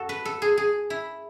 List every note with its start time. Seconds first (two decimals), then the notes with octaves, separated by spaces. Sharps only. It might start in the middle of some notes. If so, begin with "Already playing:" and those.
Already playing: F#2 F#4 A4
0.09 B4
0.25 A4
0.42 G#4
0.58 G#4
0.90 E4